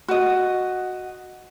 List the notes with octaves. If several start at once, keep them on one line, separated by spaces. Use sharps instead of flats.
F#4 D#5